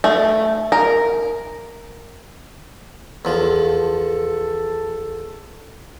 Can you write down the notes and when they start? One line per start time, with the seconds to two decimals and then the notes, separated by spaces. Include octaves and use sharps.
0.04 A3
0.72 A#4
3.25 E2 F3 A4